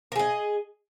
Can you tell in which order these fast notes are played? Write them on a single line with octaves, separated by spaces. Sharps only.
A#4 G#4 D#5